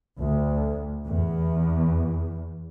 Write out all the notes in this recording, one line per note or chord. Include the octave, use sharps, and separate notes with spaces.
D2
E2